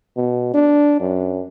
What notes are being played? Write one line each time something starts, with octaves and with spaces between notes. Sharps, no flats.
B2
D4
F#2